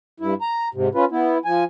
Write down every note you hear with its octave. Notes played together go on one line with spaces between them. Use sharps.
G2 E4
A#5
G#2 C3
C#4 F4 B4
B3 E4
F3 G#5